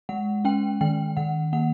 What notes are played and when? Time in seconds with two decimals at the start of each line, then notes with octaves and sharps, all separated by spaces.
0.09 G#3 F#5
0.45 C#4 G5
0.81 D#3 G5
1.17 D#3 F#5
1.53 A#3 F#5